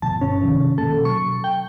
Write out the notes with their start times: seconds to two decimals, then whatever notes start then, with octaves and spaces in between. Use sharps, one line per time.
0.02 G1 B2 F3 A5
0.21 G1 C#4
0.43 C3 D#3 F3
0.78 B2 D#3 A#3 A4
1.05 F#3 C#6
1.44 G5